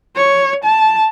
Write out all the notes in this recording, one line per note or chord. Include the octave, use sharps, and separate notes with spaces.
C#5
A5